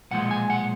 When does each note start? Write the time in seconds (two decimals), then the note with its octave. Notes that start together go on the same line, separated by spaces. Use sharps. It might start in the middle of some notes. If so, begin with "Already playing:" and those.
0.11 B1 A#2 F3 G#3 F#5
0.31 G#5
0.50 F#5